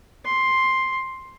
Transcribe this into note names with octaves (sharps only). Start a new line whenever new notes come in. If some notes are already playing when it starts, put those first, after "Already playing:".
C6